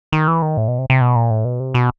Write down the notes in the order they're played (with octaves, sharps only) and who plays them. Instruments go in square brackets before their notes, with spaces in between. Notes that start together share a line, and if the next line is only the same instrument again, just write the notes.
[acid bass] D#3
E3
D#3
A2
B2
C3
C3
B2
A#2
A2
B2
C3
B2